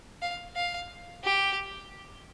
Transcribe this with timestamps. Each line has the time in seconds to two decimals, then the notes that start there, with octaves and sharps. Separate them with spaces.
0.22 F5
0.56 F5
1.24 G4